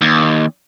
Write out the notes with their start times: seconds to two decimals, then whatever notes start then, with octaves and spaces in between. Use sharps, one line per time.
0.01 D#2